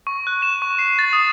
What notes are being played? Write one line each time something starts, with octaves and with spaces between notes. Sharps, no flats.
C#6
F#6
E7
C#6
C7
A6
D#6